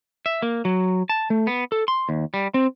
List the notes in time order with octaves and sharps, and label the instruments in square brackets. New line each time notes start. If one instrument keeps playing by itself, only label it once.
[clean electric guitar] E5
A#3
F#3
A5
A3
B3
A4
C6
D#2
G3
C4